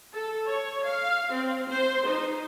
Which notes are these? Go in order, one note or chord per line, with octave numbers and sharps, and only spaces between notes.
A4
C#5
F5
C4
C5
D#4